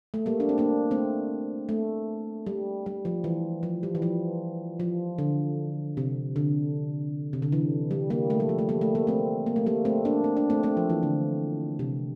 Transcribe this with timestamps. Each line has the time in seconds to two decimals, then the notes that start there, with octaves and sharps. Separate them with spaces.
0.14 A3
0.26 G3 A#3
0.40 D4
0.49 C4
0.58 A#3 D4
0.91 A3 C4
1.69 A3
2.46 G3
2.86 G3
3.05 F3
3.24 E3
3.63 F3
3.83 G3
3.95 E3
4.02 F3
4.80 F3
5.18 D3
5.97 C3
6.36 D3
7.33 C3
7.42 D3
7.52 E3
7.91 G3
8.10 G3 A#3
8.30 A3
8.40 G3
8.49 F3
8.59 A3
8.69 G3 A#3
8.81 A3
8.95 G3 A#3
9.07 A3 C4
9.46 A#3
9.56 A3
9.66 G3 A#3
9.85 A3 C4
10.05 A#3 D4
10.24 C4
10.37 D4
10.50 A3 C4
10.63 A3 C4
10.77 F3
10.90 E3
11.03 D3
11.79 C3